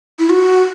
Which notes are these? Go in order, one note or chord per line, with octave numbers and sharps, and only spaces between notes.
E4
F#4